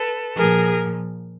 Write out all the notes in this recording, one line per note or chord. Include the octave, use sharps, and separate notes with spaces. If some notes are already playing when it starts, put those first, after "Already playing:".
Already playing: A4 B4
A#2 F3 G#4 A#4